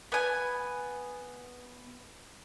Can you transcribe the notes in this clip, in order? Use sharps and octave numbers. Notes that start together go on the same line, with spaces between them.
B3 G#5